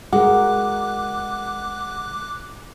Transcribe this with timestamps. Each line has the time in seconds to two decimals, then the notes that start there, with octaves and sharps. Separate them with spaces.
0.13 G#3 F#4 G#4 A#4 F#5 D6 F#6